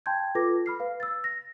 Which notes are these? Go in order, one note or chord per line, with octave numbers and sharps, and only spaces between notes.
G5 A5 C6 G6 G#6
F4 A4 B4 D6 A#6
B5 F6 C7
B4 F5
E6 A6
A#6